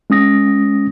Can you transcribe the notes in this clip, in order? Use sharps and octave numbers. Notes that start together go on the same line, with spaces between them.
G#3 C#4 D#6 A#6